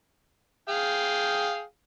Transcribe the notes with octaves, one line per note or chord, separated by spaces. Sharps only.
G#4 F5 G5